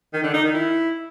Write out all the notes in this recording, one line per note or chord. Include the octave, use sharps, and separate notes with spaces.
D#3
D3
D#4
D#3
E4